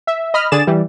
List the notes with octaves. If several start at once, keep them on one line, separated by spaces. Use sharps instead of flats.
E5
D#5 B5 F6
D3 G#4 D5 A6 E7
E3 G3